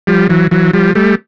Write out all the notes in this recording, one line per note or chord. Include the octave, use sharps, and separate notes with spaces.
F3 G3
E3 F#3
E3 F#3
F3 G3
G3 A3